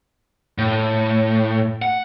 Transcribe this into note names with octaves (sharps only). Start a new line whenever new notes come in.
A2
F#5